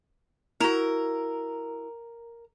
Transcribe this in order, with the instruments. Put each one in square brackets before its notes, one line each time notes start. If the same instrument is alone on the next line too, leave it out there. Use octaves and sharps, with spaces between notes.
[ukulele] E4 F#4 [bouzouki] A#4